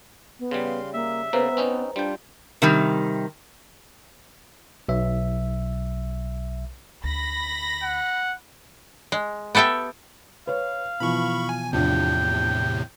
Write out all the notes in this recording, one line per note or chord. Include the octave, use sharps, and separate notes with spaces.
B3
C#3 G3 F5 C6
A#3 E5
C#3 A#3 B3 B4 C5 A#5
C4 C#4 D#4
G3 D4 F4 G5
C3 D#3 G3
B1 E5
D2 B5 A#6
F#5
G#3
B3 G4 A4 E5 G5
B4 C#5 F5
B2 E3 F3 B5 C#6
G#5
E2 A2 C3 F3 D4 G5